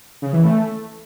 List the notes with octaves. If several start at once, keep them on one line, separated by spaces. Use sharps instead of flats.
C#3
E3
A3